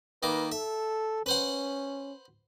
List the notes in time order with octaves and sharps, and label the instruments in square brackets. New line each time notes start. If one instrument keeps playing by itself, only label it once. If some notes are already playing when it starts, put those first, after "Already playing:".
[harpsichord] D#3 A#3 D6 [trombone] B4
[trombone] A4 [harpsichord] E5
[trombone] C#4 [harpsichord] B4 C5 F#5